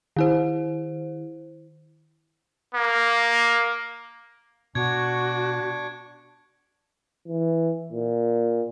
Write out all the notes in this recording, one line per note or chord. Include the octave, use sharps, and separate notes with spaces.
D#3 E4 C5
A#3
B2 D4 F#4 C#6 D6 G#6
E3
A#2